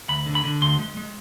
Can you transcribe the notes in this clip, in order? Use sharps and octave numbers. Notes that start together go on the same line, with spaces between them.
D2 B5
D3
B5
D3
D2 C6
G#3
G#3